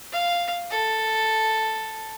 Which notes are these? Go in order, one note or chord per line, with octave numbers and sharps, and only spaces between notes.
F5
A4